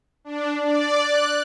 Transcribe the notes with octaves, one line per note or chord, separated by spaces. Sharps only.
D4
D5
F#6